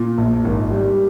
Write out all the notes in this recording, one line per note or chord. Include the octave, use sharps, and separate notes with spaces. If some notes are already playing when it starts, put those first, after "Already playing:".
Already playing: A#2
A#1
G#1
G3